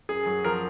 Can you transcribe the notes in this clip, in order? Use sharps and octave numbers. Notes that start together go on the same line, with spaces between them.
F#2 G#4
F#3
F3 A#4